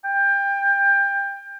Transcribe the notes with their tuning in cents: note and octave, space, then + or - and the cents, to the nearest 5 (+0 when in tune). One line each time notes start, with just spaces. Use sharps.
G5 +25